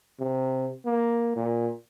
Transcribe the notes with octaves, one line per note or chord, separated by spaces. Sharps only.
C3
A#3
A#2